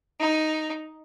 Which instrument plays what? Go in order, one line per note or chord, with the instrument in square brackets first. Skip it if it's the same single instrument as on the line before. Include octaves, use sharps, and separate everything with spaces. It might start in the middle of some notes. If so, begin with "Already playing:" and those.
[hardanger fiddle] D#4